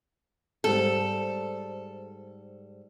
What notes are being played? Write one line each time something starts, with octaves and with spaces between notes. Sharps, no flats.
G#2 G3 A4 C5